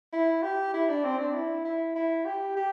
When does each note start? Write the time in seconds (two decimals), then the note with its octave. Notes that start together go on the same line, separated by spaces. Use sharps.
0.13 E4
0.43 G4
0.74 E4
0.89 D4
1.04 C4
1.19 D4
1.34 E4
1.65 E4
1.95 E4
2.25 G4
2.56 G4